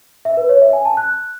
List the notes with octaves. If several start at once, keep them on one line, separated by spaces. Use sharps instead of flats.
E5
B4
C#5
E5
G#5
A5
F#6